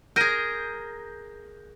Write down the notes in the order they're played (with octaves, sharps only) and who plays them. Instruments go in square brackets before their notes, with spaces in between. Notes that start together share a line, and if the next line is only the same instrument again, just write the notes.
[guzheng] G#4 A#4 [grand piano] G6 A#6 D#7